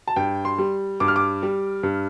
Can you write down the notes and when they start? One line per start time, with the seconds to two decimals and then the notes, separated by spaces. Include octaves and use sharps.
0.08 A5
0.16 G2 G5
0.45 C6
0.58 G3
1.00 G2 D6
1.08 F6
1.16 D6
1.42 G3
1.83 G2